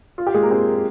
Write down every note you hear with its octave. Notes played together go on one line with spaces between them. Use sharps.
F4
G4
G#3 G#4
A#3 A#4
C4 C5
A#4